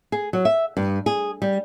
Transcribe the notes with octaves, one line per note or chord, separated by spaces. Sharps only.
G#4
F#3
E5
G2
G#4
G3